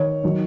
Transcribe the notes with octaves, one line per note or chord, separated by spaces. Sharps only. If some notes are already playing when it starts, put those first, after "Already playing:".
Already playing: D#3 C#5
D#3 F#3